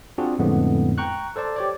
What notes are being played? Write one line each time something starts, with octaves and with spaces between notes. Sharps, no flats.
C4 D4 F4 F#4 G#4
F2 A2 D3 G#3 B3
G5 A#5 C#6 F#6
A4 C5 D5 A5
G4 C#5 D5